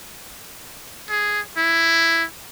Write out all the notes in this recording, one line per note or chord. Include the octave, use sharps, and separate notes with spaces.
G#4
E4